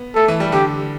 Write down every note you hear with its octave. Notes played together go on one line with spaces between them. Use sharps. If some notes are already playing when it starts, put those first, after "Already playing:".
Already playing: B3
A3 A4
E3
G3
D3 G4